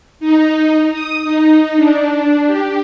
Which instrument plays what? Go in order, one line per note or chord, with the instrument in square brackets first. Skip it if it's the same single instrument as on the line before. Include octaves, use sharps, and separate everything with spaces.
[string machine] D#4
D#6
D#4
D4
G4